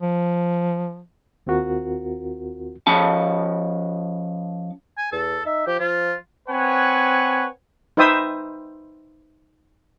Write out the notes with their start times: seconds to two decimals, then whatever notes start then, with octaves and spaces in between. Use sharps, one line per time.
0.02 F3
1.47 D#2 C4 F4 F#4 A#4
2.87 F3 C#4 A5
4.98 G#5
5.12 E2 A4
5.46 D#4 E5
5.67 F3 G4
5.79 F3 F4
6.49 C4 B4 C#5 F#5 G#5
7.97 D#4 B4 C5 E5 G5 D#6